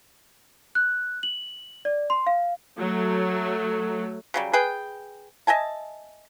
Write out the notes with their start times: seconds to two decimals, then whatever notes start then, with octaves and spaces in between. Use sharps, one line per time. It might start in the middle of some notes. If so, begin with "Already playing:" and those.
0.75 F#6
1.23 F#7
1.85 D5
2.10 C6
2.27 F5
2.79 F#3 A3
4.34 C#3 F#3 G3
4.53 G#4 B4 G5
5.47 D#5 E5 G#5 A5